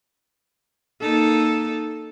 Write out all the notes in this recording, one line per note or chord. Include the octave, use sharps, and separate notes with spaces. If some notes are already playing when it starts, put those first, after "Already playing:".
A#3 D#4 A4